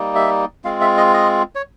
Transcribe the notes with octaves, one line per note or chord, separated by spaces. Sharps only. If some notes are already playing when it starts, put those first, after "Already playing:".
Already playing: G3 A#3 D#4
E5
G#3 C4 F4 F5
E5
D#5
D#5
C#5